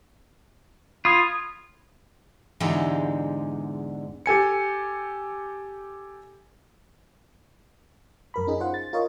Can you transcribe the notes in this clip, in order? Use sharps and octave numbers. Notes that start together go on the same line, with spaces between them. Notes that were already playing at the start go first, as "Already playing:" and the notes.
F4 B5 D#6 G#6
E2 G#2 D3 G#3 G4
G4 A4 G#5 C#7
F#2 A#4 B5
C#4 D#4 G#4
F4 C5 F#5
A6
F4 A#4 C#5 D#5